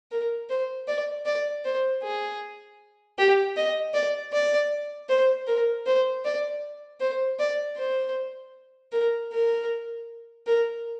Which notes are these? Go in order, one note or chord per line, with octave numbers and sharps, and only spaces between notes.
A#4
C5
D5
D5
C5
G#4
G4
D#5
D5
D5
C5
A#4
C5
D5
C5
D5
C5
A#4
A#4
A#4